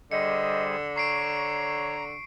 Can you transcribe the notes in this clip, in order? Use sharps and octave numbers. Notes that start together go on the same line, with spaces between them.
D3 G3 G#4 C5 D#5 C#7
C#5 A#5 C#6 C7 D7